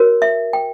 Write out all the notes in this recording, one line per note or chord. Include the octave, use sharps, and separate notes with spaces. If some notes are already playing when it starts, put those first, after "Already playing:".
Already playing: F#4 A#4 C#5
E5
G5